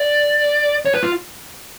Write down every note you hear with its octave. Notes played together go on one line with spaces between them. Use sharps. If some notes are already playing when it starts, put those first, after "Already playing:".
Already playing: D5
C#5
B4
F4